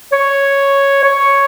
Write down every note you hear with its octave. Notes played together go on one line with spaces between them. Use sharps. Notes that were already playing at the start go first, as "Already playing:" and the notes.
C#5
C#5